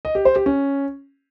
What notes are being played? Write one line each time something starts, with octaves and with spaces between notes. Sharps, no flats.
D#5
G4
C5
G4
C#4